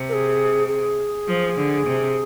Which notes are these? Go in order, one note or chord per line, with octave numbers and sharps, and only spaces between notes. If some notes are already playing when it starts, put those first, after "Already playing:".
Already playing: C3
A#4
G#4
G#4
F3
D3
C3